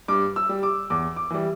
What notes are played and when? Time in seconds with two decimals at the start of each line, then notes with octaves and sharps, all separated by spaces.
0.08 G2 D6
0.36 E6
0.49 G3
0.63 D6
0.90 E2 D6
1.16 D6
1.30 E3 G3